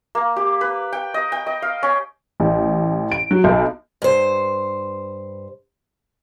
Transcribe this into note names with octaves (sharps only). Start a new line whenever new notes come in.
A#3
G4
B4
G5
D#5
G5
D#5
F5
C#4
A1
D7
F#3
B1
G2 C5